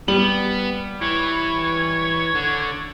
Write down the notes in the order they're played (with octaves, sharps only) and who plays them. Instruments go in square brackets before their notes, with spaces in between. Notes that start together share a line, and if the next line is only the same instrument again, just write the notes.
[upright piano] G3 F#7 [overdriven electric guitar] B3
[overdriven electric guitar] E3 [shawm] C#5
[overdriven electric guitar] D3